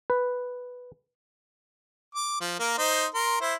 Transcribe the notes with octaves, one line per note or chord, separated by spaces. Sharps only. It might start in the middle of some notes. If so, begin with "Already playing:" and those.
B4
D6
F3
A#3 A#4
D#4 C5
A#4 C6
E4 C5